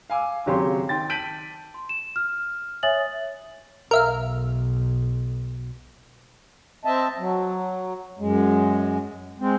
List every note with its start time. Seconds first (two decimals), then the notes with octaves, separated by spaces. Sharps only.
0.10 F5 G#5 D6 E6
0.46 G#1 C#3 F#3 G4 C#5 C6
0.89 D#3 G5 C6 A6
1.09 A5 G6 B6 D7 D#7 F#7
1.74 C6
1.89 E7
2.16 F6
2.83 C#5 E5 G#5 D#6 A6 F#7
3.91 B1 A#4 E5 F5
6.85 C4 D#5 E5 A5
7.19 F#3
8.19 F#2 G#3
9.40 G#3 C4